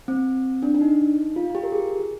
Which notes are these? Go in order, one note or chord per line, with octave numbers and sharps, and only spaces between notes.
C4
D4
D4
D#4
F4
F4
G4
A#4
G#4